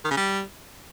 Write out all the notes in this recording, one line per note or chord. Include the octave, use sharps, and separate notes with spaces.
D#3
C#3
G3